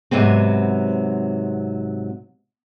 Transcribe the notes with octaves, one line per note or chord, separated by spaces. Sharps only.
G#2 C3 F#3 B3 C4